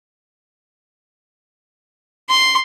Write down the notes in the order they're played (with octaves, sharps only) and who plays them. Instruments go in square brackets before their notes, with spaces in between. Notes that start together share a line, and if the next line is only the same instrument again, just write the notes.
[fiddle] C6